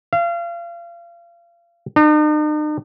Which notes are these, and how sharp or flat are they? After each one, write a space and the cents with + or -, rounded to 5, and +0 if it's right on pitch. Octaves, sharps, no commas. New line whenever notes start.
F5 -30
D#4 -45